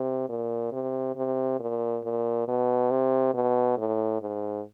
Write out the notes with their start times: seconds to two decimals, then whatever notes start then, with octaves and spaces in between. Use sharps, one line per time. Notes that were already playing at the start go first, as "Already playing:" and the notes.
Already playing: C3
0.30 A#2
0.73 C3
1.16 C3
1.60 A#2
2.04 A#2
2.48 B2
2.91 C3
3.34 B2
3.78 A2
4.22 G#2